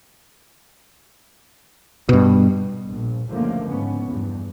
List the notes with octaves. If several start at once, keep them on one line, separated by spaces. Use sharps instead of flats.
G2 B2
A#1
C#2 F#2 D3 F3 A3 A#3
G#2 B3 C#4
E2 G2